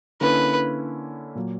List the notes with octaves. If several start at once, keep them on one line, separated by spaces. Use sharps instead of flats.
D3 A#3 C#4 E4 B4
A#2 F#3 A#3